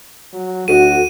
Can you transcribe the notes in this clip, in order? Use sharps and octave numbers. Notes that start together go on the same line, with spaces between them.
F#3
D2 F#4 D#7